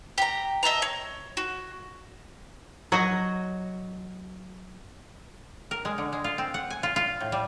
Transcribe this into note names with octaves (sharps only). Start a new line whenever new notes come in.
G4 A#5
D#5 E5 A5 A#5
C#5
F#4
F#3 F#4 D#5
A#4
G#3
D3
G#3
F4
C4
F#5
G#5
F4
F4
A2
G3